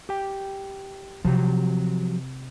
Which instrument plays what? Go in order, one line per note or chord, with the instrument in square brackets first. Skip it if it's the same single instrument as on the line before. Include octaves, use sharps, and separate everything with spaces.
[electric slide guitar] G4 G5
[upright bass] C3 [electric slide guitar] F3 F#3 G4